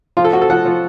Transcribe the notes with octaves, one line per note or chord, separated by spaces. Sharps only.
F3 F4
A4
F3 F#4
A4
F3 F#5
F3